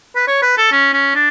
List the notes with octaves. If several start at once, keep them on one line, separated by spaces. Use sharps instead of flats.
B4
C#5
B4
A4
C#4
C#4
D4